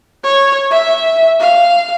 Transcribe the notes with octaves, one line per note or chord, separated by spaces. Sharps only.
C#5
E5
F5